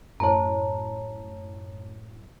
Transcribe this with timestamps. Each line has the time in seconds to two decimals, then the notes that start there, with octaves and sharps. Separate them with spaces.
0.20 F#2 A2 C#5 A5 A#5